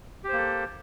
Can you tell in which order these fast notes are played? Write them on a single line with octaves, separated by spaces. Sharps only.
G4 C5 A#3 A4